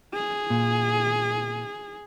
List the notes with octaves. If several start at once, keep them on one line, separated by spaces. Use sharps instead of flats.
G#4
A#2